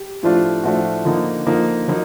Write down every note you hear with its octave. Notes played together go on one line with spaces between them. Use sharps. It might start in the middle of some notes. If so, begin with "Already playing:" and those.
Already playing: G4
A2 F3 A3 D4 F4
A2 F3 A3 D4 F4 F#4
D3 F3 A#3 D#4
D3 F3 A#3 D#4
D3 F#3 A#3 D#4